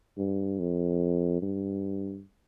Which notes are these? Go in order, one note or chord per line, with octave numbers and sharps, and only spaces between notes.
G2
F2
G2